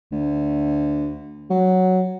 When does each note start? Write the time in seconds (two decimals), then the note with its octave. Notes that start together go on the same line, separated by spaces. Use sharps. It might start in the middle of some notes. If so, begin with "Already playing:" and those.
0.12 D2
1.50 F#3